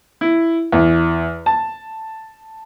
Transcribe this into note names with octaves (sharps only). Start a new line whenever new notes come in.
E4
E2
A5